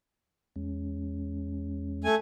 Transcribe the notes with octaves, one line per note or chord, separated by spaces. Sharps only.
E2 G#3 C#4
A3 G#5